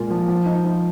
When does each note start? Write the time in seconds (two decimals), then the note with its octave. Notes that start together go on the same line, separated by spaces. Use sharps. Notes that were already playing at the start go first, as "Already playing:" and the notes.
Already playing: A#2 G#3 A#3 F4
0.10 F3
0.28 F3
0.46 D#4
0.64 F3